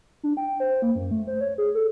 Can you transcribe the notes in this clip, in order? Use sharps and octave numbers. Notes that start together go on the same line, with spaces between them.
D4
G5
C5
A#3
F#2
A3
C5
C#5
G#4
A4